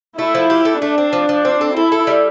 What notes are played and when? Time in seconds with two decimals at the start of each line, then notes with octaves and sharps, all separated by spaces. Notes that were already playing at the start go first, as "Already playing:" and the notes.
0.18 A3 E4
0.35 F3
0.50 G4
0.65 A3
0.81 A3 D4
0.98 C4
1.13 F3
1.29 F3
1.45 C4
1.61 A4
1.76 E4 A4
1.92 A4
2.07 G3